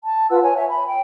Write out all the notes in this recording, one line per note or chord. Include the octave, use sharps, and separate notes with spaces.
A5
F4 B4 F#5 E6
C#5 G#5
C#5 E5
B5
G5